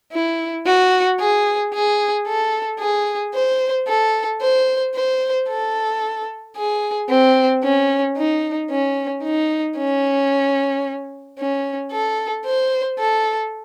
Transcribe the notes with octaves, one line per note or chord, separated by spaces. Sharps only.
E4
F#4
G#4
G#4
A4
G#4
C5
A4
C5
C5
A4
G#4
C4
C#4
D#4
C#4
D#4
C#4
C#4
A4
C5
A4